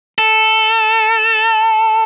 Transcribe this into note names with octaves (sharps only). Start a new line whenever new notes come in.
A4